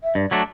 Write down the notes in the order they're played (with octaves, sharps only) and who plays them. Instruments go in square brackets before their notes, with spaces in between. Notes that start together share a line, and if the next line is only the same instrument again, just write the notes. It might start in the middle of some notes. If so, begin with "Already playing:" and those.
[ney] E5
[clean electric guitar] G2 [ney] D5
[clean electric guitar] F#3 A3 D4